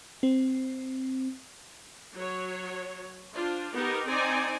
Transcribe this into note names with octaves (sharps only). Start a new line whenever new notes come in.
C4
F#3 C#5
D4 F4 C5
B3 D#4 G4 A#4
C4 D#4 D5 G#5